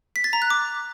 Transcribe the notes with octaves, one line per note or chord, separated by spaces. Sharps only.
B6
A6
A#5
F#6
D6